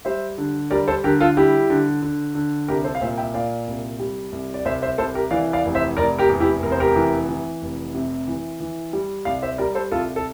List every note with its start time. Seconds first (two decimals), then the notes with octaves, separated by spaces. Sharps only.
0.05 G3 C5 E5
0.38 D3
0.71 G3 A#4 D5
0.88 A4 C5
1.04 D3 G4 A#4
1.20 F4 A4
1.37 G3 E4 G4
1.70 D3
2.02 D3
2.35 D3
2.68 C2 G4 A#4
2.84 A4 C5
2.95 F5
3.01 A#2 C5 E5
3.18 E5 G5
3.34 A#2 D5 F5
3.67 C2
3.99 G3
4.32 C2
4.54 D5
4.65 C2 C5 E5
4.82 C5 E5
4.98 C2 A4 C5
5.15 G4 A#4
5.31 E3 D5 F5
5.53 D5 F5
5.64 F1
5.75 C5 E5
5.97 F1 A#4 D5
6.19 G4 A#4
6.29 E2
6.40 E4 G4
6.63 F1 A#4
6.72 C5
6.80 G4 A#4
6.96 E3
7.29 E3
7.62 F1
7.94 C3
8.27 E3
8.60 E3
8.93 G3
9.25 C2 D5 F5
9.42 C5 E5
9.58 G3 A#4 D5
9.75 A4 C5
9.91 C2 F4 A4
10.16 A4